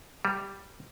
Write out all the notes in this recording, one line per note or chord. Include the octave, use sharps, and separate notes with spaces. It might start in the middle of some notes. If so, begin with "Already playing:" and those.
G3